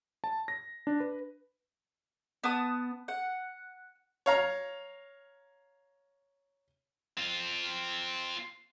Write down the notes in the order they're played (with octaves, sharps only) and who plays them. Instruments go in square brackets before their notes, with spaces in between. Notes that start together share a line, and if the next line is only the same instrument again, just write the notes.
[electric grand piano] A5
A#6
D4
B4
[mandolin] B3 A5 D#6
F#5
[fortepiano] C#5 F5 A#5
[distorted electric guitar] C4 F4